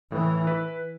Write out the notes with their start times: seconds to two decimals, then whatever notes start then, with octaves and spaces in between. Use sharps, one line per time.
0.11 A2 E3
0.47 E4 B4